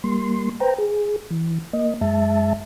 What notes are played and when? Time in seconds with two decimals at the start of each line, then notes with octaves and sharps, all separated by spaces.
0.04 G3 A#3 C6
0.60 B4 C5 G5 A#5
0.78 G#4
1.31 E3
1.73 A#3 D#5
2.01 F#2 G#3 E5 A5